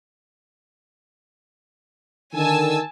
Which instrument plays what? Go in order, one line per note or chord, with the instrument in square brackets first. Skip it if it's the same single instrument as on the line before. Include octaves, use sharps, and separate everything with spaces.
[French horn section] D3 D#3 [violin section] G#5 A5 E6